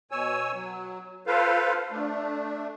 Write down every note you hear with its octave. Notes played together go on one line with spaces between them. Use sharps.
B2 C#5 G#5 E6
F#3
F4 A4 B4 C5 F5
A3 D4